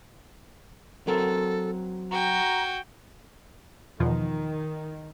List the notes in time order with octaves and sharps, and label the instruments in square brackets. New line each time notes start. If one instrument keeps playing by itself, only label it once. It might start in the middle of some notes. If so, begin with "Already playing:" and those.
[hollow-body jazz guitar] F#3 C4 A#4 [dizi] A4
[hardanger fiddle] F#4 G5 [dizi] A#5
[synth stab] E2 B2 F3 [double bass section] D#3